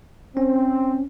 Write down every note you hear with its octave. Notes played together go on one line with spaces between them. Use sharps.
C4 C#4